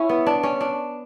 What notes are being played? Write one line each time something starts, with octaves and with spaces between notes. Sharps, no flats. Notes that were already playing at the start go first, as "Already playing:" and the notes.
Already playing: C#4 E4
B3
D4
C#4
D4